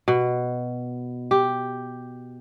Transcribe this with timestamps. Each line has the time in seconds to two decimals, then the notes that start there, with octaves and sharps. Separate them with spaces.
0.08 B2
1.31 G4